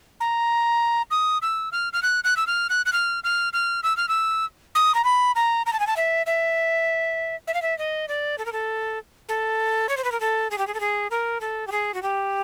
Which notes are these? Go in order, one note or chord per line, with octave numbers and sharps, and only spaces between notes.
A#5
D#6
E6
F6
F6
F#6
F#6
E6
F6
F#6
F#6
F6
F6
F6
E6
F6
E6
D#6
A#5
B5
A#5
A#5
A5
G#5
A5
E5
E5
E5
F5
E5
D#5
D5
A4
A#4
A4
A4
C#5
C5
B4
A#4
A4
G#4
G4
G#4
A4
G#4
A#4
A4
G4
G#4
F#4
G4